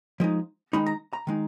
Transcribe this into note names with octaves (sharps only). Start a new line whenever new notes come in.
F3 G#3 D#4
D#3 G#3 D#4 B5
A#5
A#5
D#3 G#3 D#4